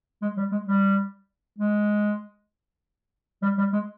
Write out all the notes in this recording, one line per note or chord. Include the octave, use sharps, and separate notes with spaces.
G#3
G3
G#3
G3
G#3
G3
G3
G#3